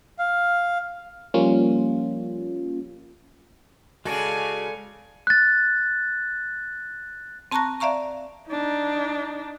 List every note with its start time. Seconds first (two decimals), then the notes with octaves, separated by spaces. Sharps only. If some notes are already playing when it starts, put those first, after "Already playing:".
0.19 F5
1.34 F3 G3 A#3 C#4 F4
4.05 C#3 G#3 F#4 A4 D5 F5 G#5
5.27 F#6 A6
7.51 C4 A5 A#5 C#6 F#6 A#6
7.80 D5 E5 F5 A#5 C#6
8.49 D4 D#4